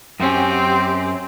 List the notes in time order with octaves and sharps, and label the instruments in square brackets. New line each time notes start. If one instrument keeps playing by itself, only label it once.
[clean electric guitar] F#2 C#4 [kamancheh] C4 G4